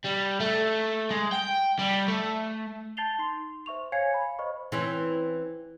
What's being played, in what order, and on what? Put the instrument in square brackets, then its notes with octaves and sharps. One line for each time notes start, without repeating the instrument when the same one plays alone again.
[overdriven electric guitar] G3
A3
G#3
G5
G3
A3
[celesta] A5 G6 A6 C7 F7 G7
D#4 C6 C7
C5 E5 C#6 F7
C#5 F5 G#5 G#6 C7 C#7
B5
C5 D#5 B5 C#6
[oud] E3 C4 C#4